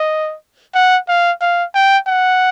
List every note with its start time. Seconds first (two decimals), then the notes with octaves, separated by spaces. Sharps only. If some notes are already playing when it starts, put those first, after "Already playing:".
Already playing: D#5
0.75 F#5
1.09 F5
1.41 F5
1.75 G5
2.08 F#5